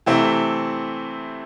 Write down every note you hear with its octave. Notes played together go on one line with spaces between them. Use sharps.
C3 E3 A3 C4 E4